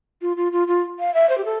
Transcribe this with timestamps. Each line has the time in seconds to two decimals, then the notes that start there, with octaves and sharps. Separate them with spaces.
0.21 F4
0.36 F4
0.52 F4
0.67 F4
0.99 F5
1.13 E5
1.29 C5
1.37 G4
1.45 A4